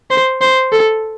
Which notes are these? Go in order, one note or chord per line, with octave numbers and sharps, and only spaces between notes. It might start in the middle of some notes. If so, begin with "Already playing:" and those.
C5
C5
A4